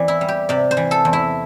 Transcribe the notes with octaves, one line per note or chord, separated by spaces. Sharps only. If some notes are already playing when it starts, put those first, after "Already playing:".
Already playing: E2 E3 C4 C5 D5
E4
G3
G4
C3 D5
C5
E3
A4
E2
E4